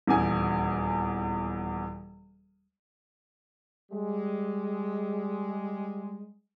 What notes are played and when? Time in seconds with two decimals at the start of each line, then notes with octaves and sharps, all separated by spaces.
0.07 D#1 E2 G#5
3.92 G3 G#3